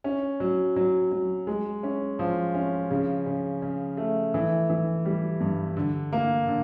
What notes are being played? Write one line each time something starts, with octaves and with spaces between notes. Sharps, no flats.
C#4
F#3
F#3
F#3
G#3
C#4
F3
C#4
C#3
C#3
C#3
A3
E3
E3
G3
G2
D3
A#3
D3